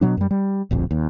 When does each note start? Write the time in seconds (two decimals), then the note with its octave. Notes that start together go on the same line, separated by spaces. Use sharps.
0.01 B2 F#3 D4
0.17 F#2 G3
0.31 G3
0.71 D1 A#1 F2
0.91 D#2